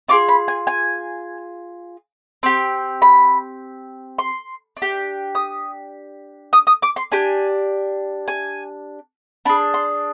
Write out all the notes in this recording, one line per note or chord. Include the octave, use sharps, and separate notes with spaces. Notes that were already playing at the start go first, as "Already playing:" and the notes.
D4 F4 G#4 D6
B5
G#5
G#5
C4 G4
B5
C6
D4
G4
D#6
D#6
D#6
D6
C6
D4 G4 G#5
G#5
D4 G#4 B5
C6